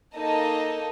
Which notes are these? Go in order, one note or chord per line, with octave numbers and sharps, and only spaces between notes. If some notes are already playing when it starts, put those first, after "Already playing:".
A#3 D#4 A4 D#5 A5